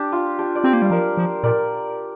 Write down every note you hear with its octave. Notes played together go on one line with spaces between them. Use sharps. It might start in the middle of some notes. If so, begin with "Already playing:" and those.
Already playing: D4 G4
F4
D4 G4
D5
C4 G4 C5
A#3
G3 F5
F3 A#4 D5
F3
A#2 A#4 D5